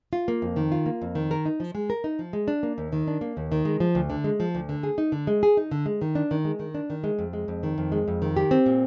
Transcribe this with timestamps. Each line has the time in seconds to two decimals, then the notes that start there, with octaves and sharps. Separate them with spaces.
0.13 F4
0.28 A#3
0.42 F2
0.56 D#3
0.72 F4
0.86 A#3
1.02 F2
1.15 D#3
1.31 A#4
1.46 D#4
1.60 F3
1.75 G#3
1.90 A#4
2.04 D#4
2.19 F3
2.33 G#3
2.48 D4
2.63 A#3
2.78 D#2
2.93 D#3
3.07 D4
3.21 A#3
3.37 D#2
3.52 D#3
3.65 G#3
3.80 F3
3.95 D2
4.10 D3
4.24 G#3
4.40 F3
4.55 D2
4.69 D3
4.83 G#4
4.98 D#4
5.12 D3
5.27 G#3
5.43 G#4
5.57 D#4
5.71 D3
5.86 G#3
6.02 D#3
6.15 D4
6.31 D#3
6.45 G#3
6.59 D#3
6.75 D4
6.90 D#3
7.04 G#3
7.19 F2
7.33 G#3
7.48 F2
7.63 D#3
7.78 F2
7.92 G#3
8.08 F2
8.22 D#3
8.37 G4
8.51 C4
8.66 A#2